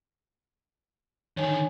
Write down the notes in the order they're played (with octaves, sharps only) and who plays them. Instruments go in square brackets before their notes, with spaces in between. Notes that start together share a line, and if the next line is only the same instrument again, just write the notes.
[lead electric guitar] D3 D#3 [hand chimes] C#5 G#5